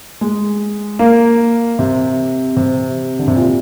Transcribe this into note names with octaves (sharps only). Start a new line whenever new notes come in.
G#3
A#3
C3
C3
D3
C3
A#2